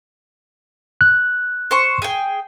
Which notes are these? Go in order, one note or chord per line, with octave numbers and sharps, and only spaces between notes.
F#6
C5 C#6
G#4 G5